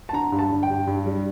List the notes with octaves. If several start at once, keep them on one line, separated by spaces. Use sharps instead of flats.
A5
D3 A#5
G2
A5
G2
G5
G2
G2
G3